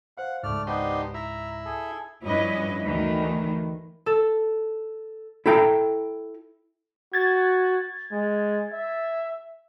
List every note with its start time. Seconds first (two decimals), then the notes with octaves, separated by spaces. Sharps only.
0.18 C5 F5 F#5
0.43 C#2 G#2 A3 D5 F6
0.67 B3 D4 D#4 G4 C5
1.14 E4 E5 A#5
1.65 G#4 A4
2.25 G2 F3 C#4 E4 B4 D#5
2.84 D2 D#3 E3 A3
4.06 A4
5.46 E4 A4 G5 A#5
7.13 F#4 G#6 A6
8.12 G#3
8.72 E5